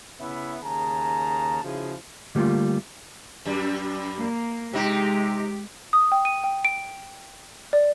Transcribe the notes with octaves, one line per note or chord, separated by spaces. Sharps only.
C#3 B3 C#4 E4 E5
D#2 C#3 G#4 A5 A#5
C#3 F3 D#4 E4 F#4 G#4
D3 G3 A3 A#3 F4
F#2 G3
A#3
C3 G#3 D#4 G4
D#6
G5
D#7
G5
D7
D5